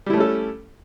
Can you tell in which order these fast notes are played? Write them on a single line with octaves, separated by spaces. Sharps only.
G3 E4 A3 C#4 A4